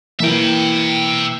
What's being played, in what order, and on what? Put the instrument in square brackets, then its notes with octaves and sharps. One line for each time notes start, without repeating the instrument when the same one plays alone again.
[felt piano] E3 A#3 E4 [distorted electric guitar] E5 G5